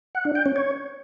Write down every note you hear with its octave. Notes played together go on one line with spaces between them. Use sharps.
F#5
D4
G5
C#4
C#5